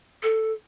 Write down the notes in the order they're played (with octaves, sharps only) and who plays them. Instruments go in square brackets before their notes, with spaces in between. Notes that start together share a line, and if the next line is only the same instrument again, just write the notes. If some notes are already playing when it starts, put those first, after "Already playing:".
[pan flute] A4